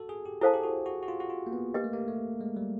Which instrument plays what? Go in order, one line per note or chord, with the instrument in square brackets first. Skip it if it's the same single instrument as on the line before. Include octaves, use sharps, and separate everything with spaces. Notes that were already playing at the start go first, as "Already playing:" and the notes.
Already playing: [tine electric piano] F#4 A4
G#4
G4
[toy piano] E4 A4 C5 F5 A5 [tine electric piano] G#4
[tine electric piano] G4
F#4
F#4
F#4
F4
F#4
F4
A#3
B3
[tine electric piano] A#3 [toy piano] D4 G4 B4 D#5
[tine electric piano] A3
A#3
A3
G#3
G3